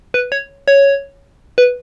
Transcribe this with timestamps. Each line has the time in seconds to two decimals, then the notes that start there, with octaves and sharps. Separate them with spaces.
0.14 B4
0.32 C#5
0.68 C#5
1.58 B4